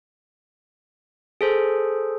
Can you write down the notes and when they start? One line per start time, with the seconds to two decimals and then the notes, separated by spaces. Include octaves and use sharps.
1.41 G#4 A4 C5